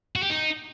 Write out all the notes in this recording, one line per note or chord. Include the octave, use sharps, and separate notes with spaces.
F#4
G4
D#4